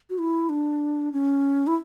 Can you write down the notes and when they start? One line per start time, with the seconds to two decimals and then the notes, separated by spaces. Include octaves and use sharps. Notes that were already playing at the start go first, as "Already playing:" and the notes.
0.10 F#4
0.18 E4
0.49 D4
1.12 C#4
1.67 E4